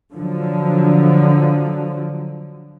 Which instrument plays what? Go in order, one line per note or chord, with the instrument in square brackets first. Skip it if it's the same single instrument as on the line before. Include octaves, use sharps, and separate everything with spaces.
[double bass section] D3 F3 F#3